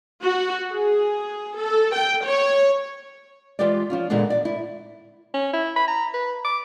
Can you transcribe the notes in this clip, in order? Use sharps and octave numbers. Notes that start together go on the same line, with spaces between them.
F#4
G#4
A4
G5
C#5
E3 G#3 F4 G4 B4 D5
F3 C#4 F4
A#2 D3 E3 G#3 B3 D4
D5
E4
C#4
E4
B5
A#5
B4
D6